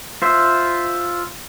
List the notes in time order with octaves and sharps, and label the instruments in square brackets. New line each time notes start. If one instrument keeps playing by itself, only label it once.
[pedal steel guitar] F4 C5 E5